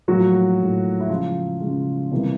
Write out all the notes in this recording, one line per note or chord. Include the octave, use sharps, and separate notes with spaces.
A2 F3 F#3 A#3 F#4
A2 F3 A#3
E4
C#3 F3 G#3 F4
C#3 F3 G#3
C3 E3 G3 A#3